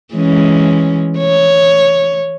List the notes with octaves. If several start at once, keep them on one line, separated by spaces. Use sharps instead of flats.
E3 G#3 C#4
C#5